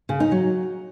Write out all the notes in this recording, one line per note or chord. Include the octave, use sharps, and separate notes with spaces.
C#3
D#4
F#3